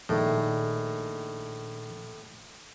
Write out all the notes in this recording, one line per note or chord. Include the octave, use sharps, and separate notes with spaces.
A#1 A2 D#3